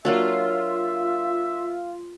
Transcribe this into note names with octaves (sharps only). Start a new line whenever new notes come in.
F#3 A#3 D4 F4 E5